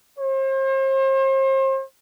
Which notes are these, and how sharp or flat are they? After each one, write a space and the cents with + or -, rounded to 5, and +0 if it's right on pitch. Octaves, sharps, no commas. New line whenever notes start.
C5 +40